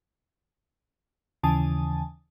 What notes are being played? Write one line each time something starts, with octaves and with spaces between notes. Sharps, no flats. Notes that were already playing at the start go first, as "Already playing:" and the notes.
D#2 C#3 E3 G#5 A5 D#6